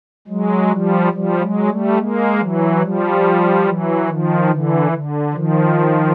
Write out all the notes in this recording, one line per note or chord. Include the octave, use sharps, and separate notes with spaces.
F#3 G#3
F3 G3
F3 G3
F#3 G#3
G3 A3
G#3 A#3
E3 F#3
F3 G3
E3 F#3
D#3 F3
D3 E3
D3
D#3 F3